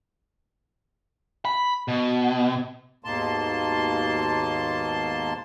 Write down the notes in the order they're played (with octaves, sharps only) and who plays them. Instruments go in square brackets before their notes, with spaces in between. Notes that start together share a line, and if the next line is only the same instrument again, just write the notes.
[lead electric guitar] B5
B2
[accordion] D#2 G#2 B2 A#3 A5 C6